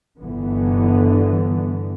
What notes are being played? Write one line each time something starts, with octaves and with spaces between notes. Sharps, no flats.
G1 D3 E3 B3